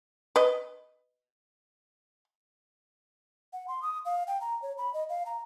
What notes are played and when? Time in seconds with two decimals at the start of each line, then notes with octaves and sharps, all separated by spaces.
0.36 B4 D#5
3.53 F#5
3.68 C6
3.82 D#6
4.05 F5
4.27 G5
4.41 A#5
4.62 C#5
4.78 B5
4.94 D#5
5.09 F5
5.26 A#5